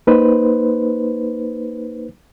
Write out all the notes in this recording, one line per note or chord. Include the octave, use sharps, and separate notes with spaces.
A#3 D#4 B4 C5